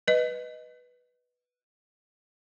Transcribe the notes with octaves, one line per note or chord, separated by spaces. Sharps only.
B4 D#5